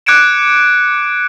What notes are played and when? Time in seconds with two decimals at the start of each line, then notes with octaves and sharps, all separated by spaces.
0.06 D6 F#6 G#6 C#7 D7 E7